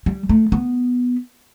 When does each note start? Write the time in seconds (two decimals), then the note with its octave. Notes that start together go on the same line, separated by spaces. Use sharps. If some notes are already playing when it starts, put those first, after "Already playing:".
0.06 G3
0.29 A3
0.52 B3